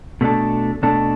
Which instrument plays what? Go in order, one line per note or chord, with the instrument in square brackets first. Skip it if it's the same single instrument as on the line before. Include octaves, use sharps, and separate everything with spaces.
[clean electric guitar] B2 A3 D4 A4
B2 A3 D4 A4